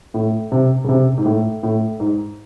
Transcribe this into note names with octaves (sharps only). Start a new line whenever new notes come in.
A2
C3
C#3
C3
G#2
A2
A2
G#2